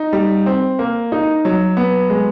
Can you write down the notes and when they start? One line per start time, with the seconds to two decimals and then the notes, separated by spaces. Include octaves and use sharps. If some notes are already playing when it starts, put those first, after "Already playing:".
Already playing: D#4
0.13 G3
0.46 C4
0.79 A#3
1.12 D#4
1.45 F#3
1.77 B3
2.10 G#3